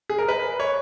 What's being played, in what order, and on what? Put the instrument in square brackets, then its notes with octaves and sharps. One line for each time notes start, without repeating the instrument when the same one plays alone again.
[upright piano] G#4
A#4
B4
C#5